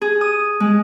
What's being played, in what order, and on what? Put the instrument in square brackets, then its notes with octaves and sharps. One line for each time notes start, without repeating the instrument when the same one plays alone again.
[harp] G#4
D#6
G#3